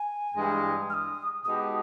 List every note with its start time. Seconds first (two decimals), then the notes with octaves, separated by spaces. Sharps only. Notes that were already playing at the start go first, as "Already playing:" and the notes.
Already playing: G#5
0.35 G2 E3 G#3
0.90 F6
0.94 D#6
1.44 B2 G#3 D#4 G4 D#6